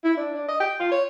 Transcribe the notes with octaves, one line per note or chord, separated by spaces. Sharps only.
E4
D4
D4
D#5
G5
F4
C#5